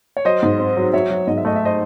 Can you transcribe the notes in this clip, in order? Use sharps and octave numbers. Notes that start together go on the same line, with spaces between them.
C#5
F#3 C5 D#5
G#2
C4
F#3
F#3 C#5 E5
F#3
G#2 D#5
E5
A3 D#5
E5
C5 D#5